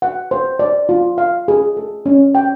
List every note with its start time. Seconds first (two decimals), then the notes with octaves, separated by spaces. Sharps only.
0.02 F#5
0.31 C5
0.59 D5
0.89 F4
1.18 F5
1.48 G#4
1.77 A4
2.06 C#4
2.35 G5